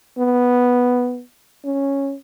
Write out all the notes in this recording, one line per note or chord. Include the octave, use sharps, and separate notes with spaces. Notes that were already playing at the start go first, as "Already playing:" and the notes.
B3
C#4